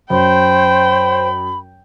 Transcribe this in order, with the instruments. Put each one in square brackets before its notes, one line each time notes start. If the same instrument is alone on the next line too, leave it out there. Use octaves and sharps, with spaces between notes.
[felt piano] F#2 [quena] C5 [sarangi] G5 [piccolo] B5